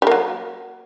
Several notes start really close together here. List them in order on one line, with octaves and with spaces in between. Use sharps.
G3 A#3 F#3